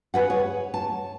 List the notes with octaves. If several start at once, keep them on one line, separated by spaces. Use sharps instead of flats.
G#4 B4 F#5
C#5
A5